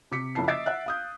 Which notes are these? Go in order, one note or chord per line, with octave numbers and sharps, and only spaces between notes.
C3 D6 B6 C#7
F#1 F3 A#3 E4 A5 C7
D#5 E5 D6 A6 C7 D7
E5 F#5 F#6
F5 D#6 G6